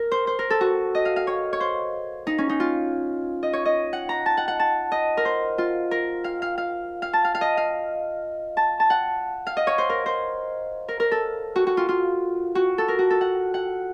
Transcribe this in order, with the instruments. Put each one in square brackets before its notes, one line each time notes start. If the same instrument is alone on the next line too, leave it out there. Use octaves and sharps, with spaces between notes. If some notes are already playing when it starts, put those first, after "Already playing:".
Already playing: [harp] A#4
C5
C5
A#4
A4
F#4
D#5
F5
F5
C#5
C#5
C5
D#4
C#4
D#4
F4
D#5
C#5
D#5
F#5
A#5
A5
F#5
F#5
A5
D#5
A#4
C5
F4
A#4
F5
F5
F5
F5
A5
F5
F5
D#5
F5
A5
A5
F#5
F5
D#5
C#5
C5
A#4
C5
A#4
A#4
A4
F#4
F#4
F4
F4
F#4
A4
A#4
F#4
A4
F#5
F#5